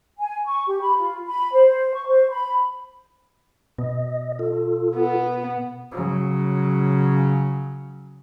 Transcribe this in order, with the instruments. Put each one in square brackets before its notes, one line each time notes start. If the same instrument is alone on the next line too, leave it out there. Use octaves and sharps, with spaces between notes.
[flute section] G#5
C#6
G4
B5
F4
B5
C5
C#6
C5
B5
[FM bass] B2 [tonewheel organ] D#5
[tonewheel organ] F4 A4
[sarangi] B3
[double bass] C#3 F#3